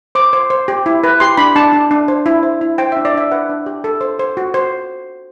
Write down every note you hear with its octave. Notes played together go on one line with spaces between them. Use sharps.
C5 D6
C5
C5
G4
E4
B4
G4 C6
D4 B5
D4 A5
D4
D4
C5
E4
C5
E4
C5 G5
E5
D4
D5
D4 E5
B4 F#5
D4
G4
A4
C5
C5
F#4
C5